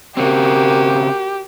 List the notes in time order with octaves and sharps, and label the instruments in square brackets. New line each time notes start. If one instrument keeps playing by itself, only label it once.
[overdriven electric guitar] C#3 C4 [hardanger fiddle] A#3 F#4 [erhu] G4